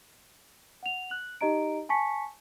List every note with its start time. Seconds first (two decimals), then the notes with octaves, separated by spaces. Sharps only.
0.83 F#5 F7
1.10 F#6 F#7
1.41 D#4 G4 D#5 A#5 D7
1.89 G#5 A5 C#6 B6 C#7